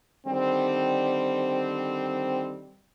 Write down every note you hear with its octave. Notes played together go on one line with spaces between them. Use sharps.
D3 D#3 G3 C4